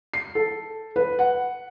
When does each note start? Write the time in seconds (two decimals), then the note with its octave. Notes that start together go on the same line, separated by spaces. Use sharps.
0.14 C7
0.35 A4
0.96 B4
1.19 F#5